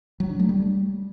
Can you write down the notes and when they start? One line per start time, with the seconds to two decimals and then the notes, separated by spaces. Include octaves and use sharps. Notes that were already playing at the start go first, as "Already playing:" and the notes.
0.20 F#3
0.30 D4
0.39 A3
0.49 G3